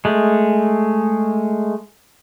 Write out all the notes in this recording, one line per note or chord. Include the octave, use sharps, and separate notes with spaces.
G#3 A3